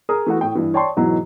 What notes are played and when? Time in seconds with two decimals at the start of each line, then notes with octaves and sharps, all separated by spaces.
0.09 G#4 A#4 D#6
0.26 E3 A3 B3 F#4
0.41 A2 G5
0.55 G2 E3
0.74 C#5 D5 G5 A5 C6 C#6
0.96 G#2 B2 E3 F#3